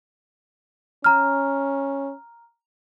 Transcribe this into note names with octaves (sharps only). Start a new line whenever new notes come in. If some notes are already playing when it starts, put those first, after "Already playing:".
C#4 A#5 F6